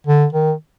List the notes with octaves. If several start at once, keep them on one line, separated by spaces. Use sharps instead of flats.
D3
D#3